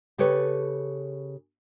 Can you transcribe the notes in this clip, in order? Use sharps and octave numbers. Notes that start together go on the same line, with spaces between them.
C#3 G4 A4 B4 C#5